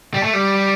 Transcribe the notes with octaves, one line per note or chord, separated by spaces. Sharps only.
G3
A3
G3